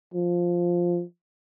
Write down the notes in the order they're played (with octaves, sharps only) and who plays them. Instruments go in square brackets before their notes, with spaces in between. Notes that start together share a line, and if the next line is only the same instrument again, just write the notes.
[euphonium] F3